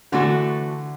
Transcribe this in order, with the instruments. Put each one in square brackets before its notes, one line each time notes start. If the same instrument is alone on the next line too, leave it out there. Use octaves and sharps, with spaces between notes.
[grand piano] D3 [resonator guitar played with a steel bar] E3 A3 D4 F#4 A4